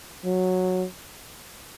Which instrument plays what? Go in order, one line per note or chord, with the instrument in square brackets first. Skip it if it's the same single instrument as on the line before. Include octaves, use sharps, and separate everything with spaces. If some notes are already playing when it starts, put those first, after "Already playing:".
[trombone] F#3